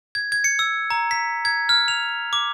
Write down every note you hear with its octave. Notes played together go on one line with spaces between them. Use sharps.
G#6
G#6
C#7
E6
A#5
B6
G#6
F6
F7
D6